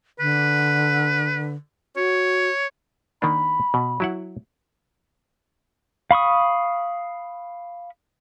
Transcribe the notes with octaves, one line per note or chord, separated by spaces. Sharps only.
D3 B4
F#4 C#5
D#3 A#3 D4 B5
B2
F#3 E4 F#5
F5 B5 C#6 D#6